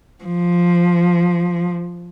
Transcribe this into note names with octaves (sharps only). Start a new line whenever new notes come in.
F3